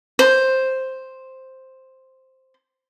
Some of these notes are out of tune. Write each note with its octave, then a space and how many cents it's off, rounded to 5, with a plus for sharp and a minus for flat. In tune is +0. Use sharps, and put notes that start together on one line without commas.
C5 +5